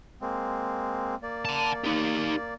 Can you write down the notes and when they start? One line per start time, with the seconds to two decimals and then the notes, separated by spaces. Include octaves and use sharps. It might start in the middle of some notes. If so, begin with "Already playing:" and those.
0.22 G#3 A#3 C4
1.22 A#3 D5
1.45 F#5 A5
1.84 D#4 G4